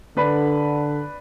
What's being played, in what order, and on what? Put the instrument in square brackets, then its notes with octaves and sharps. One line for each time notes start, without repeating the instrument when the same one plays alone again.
[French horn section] D3 [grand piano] D4 B4 B5